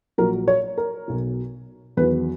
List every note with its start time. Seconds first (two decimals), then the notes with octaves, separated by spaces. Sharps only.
0.18 A#1 A#2 F#3 A#4
0.48 C#5
0.78 A#4
1.08 B1 B2 F#3
1.97 E2 D#3 F#3 B4